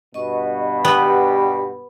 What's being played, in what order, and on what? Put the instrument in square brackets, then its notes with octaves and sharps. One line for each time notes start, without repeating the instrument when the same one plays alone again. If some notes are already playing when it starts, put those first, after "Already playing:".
[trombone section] G2 B2 [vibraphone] D#5 C#6
[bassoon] G3 [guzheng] B3 [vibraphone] G4